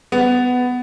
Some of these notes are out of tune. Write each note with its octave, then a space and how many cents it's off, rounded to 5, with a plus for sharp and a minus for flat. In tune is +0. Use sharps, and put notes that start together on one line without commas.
B3 +10